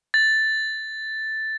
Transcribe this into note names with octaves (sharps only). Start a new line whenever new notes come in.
A6